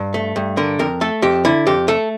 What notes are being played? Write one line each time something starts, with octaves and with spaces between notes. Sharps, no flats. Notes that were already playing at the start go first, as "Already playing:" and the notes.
Already playing: G2
A3
G2
D3 A#4
F2 A#4
A3 A4
F2 G4
D3 E4
F2 G4
A3 A4